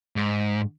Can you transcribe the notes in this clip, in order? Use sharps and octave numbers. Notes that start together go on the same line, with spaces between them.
G#2